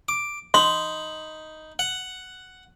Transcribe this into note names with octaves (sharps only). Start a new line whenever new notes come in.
D6
D#4 B5 C6
F#5